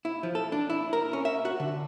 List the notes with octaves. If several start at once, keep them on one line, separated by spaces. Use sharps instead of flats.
E4
F3
A4
D4
E4
A#4
C#4
E5
F#4
D3